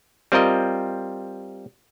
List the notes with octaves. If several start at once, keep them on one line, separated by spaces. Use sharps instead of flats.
G3 C4 F4 A#4 D#5